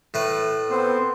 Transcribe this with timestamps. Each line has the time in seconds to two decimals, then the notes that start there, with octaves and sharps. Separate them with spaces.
0.14 A2 A3 B4
0.71 B3 C4 C5